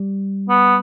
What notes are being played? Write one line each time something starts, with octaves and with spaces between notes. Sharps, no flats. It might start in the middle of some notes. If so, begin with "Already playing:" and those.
Already playing: G3
B3